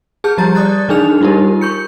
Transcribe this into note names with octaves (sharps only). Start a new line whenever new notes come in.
G#4 A5 F6 G6
F3 G3 G4 A#5 A6
D5 D#6 F#6 A6
E3 D4 D#4 G#4 F6 F7
G3 D#4 F4 G4 A#4
C#6 G6 C#7